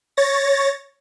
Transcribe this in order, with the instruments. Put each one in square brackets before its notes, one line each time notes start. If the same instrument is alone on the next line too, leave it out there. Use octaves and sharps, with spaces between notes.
[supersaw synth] C#5 A6 A#6